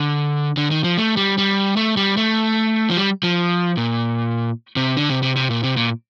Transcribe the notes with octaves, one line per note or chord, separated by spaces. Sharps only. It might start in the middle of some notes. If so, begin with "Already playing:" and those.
Already playing: D3
D3
D#3
F3
A3
G3
G3
A3
G3
A3
F3
G3
F3
A#2
C3
D3
C3
C3
C3
A#2
C3
A#2